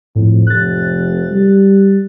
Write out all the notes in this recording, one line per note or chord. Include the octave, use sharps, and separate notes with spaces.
F2 A2
F1 F#6 A6
G3